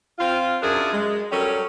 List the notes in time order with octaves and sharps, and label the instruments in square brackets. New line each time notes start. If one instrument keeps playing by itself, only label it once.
[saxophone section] C4 F4
F#2 D4 G#4 A#4 E5
G#3
F#3 G3 C#4 A4 A#4